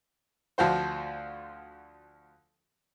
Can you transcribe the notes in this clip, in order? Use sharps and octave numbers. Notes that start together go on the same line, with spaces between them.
D2 F3 F4 F#4 C5